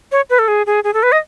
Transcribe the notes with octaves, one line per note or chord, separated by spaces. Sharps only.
C#5
B4
A4
G#4
G#4
G#4
A4
B4
D#5